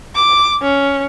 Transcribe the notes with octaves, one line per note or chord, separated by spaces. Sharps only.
D6
C#4